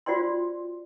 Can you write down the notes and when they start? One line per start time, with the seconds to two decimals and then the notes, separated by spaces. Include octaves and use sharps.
0.06 F4 F#4 C5 D5 G5 C6